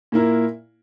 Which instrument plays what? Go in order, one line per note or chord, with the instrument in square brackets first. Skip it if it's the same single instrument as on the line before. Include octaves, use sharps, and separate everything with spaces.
[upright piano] A#2 A#3 E4 A#4